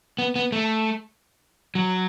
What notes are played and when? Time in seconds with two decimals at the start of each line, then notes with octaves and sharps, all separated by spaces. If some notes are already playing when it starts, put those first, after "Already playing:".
0.18 B3
0.36 B3
0.52 A3
1.75 F#3